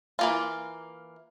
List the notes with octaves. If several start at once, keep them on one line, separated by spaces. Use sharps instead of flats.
E3 A#3 F4